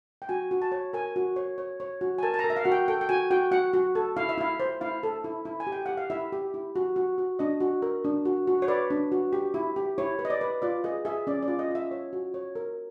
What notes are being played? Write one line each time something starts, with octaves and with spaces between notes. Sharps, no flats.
G5
F#4 G#5
F#4
A5
C#5
A#4 G#5
F#4
C#5
C#5
C#5
F#4
G#5
A#4 A5
A5
A#5
A#4
E5
F5
F#4 F#5
G5
A4 G5
G5
F#4 G#5
F#4 G5
F#4 F#5
F#4
A4
E4 F5
E5
E4 F5
C5
E4 F5
A4
E4
E4
G#5
G4
G5
G4 F#5
F5
E4 E5
G4
E4
F#4
F#4
F#4
D4 D#5
F#4
A#4
D4
F#4
F#4
C#5
B4 D5
D4
F#4
G4
E4
G4
E4 C#5
B4
D#5
D5
B4
F4 D5
G#4 D#5
G#4 E5
C#4 D5
D5
F4
D#5
F4 E5
C#5
F#4
C#5
A#4